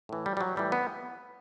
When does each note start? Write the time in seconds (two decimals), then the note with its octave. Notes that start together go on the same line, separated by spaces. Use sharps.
0.09 A2 E3
0.26 G3
0.37 G3
0.41 F#3
0.56 A2 E3 G3
0.72 B3